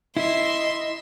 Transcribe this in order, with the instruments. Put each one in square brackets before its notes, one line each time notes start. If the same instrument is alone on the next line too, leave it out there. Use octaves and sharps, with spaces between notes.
[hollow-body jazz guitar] E4 [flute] D#5 [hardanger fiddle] E5 [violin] C6